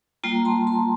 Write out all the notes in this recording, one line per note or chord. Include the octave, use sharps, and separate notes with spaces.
G3 A#3 F4 G5 A#5
A5 C6
A5 C6